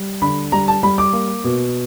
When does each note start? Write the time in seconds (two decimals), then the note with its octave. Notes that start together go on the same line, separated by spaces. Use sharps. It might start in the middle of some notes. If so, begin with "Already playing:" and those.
Already playing: G3
0.22 D3 B5
0.52 G3 A#5
0.68 A5
0.83 G3 B5
0.98 D6
1.13 A#3
1.44 B2